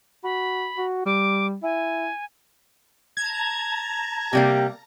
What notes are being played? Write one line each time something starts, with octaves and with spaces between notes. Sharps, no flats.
F#4 B5
F#4
G3 D6
E4 G#5
A5 A#5 G#6
C3 G3 A#3 G4